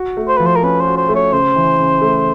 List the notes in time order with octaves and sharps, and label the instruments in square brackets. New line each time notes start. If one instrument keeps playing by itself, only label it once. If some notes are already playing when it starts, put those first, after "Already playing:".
Already playing: [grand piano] F#4
A3
[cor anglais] C5
[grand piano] F3 [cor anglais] B4
[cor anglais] C5
A#4
[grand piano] C#4 [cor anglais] B4
[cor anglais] C5
[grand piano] F#4
[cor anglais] C5
[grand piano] A3
[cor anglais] C#5
[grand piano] C#3 [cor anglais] C5
[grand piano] E3
C#3
A3